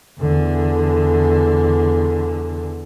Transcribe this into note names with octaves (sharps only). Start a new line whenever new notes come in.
E2 D3